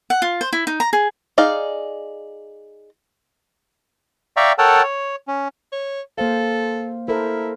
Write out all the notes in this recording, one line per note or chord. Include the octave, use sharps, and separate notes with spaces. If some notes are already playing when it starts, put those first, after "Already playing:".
F#5
F4
C5
E4
D#4
A#5
G#4
D#4 G#4 D5 F5
D5 E5 F5 G5 A#5 C#6
A4 A#4 C#5 F#5 G5 A5
C#5
C#4
C#5
A#3 A4 C5 F5
E4 A4 A#4 C5